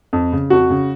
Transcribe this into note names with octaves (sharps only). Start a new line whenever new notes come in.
F2
C#3
F2 F#4
C#3